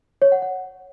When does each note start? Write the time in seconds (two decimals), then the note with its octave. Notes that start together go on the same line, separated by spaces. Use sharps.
0.22 C#5
0.32 F#5
0.42 F#5